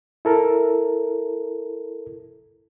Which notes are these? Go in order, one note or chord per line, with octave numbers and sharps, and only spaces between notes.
E4 A4 A#4